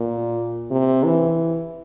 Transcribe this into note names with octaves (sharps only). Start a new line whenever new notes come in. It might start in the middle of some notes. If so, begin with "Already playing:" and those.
Already playing: A#2
C3
E3